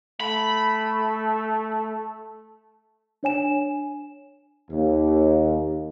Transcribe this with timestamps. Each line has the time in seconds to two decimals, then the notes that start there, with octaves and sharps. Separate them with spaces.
0.21 A3 B5
3.23 D4 C#5 G#5 E7
4.71 D#2